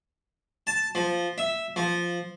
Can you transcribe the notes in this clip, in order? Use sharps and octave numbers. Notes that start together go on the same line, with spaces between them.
A5
F3
E5
F3